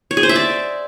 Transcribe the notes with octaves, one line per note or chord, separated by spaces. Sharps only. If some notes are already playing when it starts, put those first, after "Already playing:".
C#5
G#4
C5
E5
D5